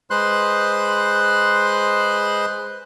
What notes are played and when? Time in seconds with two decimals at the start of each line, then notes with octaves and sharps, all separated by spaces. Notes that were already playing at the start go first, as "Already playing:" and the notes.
0.11 G#3 B4 C5 C6 F#6